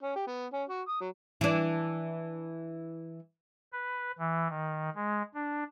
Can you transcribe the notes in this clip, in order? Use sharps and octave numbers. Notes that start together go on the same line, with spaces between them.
C#4
G4
B3
C#4
F#4
D#6
F#3
E3 D4
B4
E3
D#3
G#3
D4